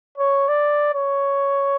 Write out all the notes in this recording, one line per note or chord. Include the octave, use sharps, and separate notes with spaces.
C#5
D5
C#5